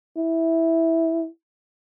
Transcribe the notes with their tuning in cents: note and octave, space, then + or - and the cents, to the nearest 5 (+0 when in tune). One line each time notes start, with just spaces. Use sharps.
E4 -10